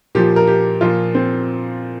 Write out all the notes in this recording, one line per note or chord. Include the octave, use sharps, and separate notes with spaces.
A#2 F3 G4
A#4
G4
A#2 F3 F4
C4